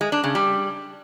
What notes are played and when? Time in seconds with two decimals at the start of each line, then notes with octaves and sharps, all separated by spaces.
0.01 G#3
0.12 D4
0.24 C#3
0.35 G3